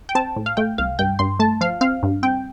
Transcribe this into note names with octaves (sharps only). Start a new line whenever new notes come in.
G5
C4 A5
A2
F5
A3 G5
C2 F5
G2 G5
G2 C6
A3 A5
F3 F5
C4 F5
G2
C4 G5